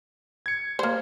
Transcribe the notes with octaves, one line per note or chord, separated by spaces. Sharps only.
G#6 C#7
A#3 C5